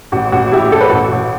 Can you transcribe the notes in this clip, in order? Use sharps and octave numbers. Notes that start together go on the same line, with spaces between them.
A1 F#4
A1 F#4
A2 E4 G4
A1 A4
B4
A1 F#4 A4
A1